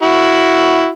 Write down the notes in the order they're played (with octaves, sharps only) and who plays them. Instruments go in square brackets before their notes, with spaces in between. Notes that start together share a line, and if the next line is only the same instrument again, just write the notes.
[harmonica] E4 F#4